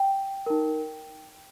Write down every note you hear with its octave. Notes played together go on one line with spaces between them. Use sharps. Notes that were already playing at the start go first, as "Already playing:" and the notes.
Already playing: G5
D#4 A#4